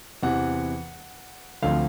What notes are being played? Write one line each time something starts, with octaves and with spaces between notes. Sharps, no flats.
E2 C3 E3 F#5
D2 D3 F3 A3 C4 F5